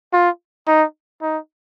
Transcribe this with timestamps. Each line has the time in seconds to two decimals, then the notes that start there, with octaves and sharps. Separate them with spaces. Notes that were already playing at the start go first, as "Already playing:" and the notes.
0.13 F4
0.68 D#4
1.22 D#4